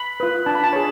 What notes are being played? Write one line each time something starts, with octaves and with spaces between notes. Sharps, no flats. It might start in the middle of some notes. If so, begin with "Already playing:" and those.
Already playing: B5
F4 B4
D4 A5
B5
A5
G#4 C#5